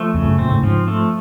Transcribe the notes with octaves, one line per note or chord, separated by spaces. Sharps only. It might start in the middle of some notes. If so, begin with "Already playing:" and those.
Already playing: F3 A3
F2 C#3
F#2
A#2 C4
A2
G#2 F3
A3